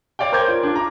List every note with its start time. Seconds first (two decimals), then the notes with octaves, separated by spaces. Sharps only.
0.19 C#5 D5 F5 G5
0.32 A#4 C5 D6 G6 G#6
0.48 F4
0.63 D4 F4
0.75 A#5 D6